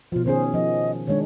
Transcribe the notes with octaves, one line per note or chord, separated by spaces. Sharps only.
B2 F3 F4
D#3 C#4 G#4 C5
F3 D#5
D#3 G#3 D4 C#5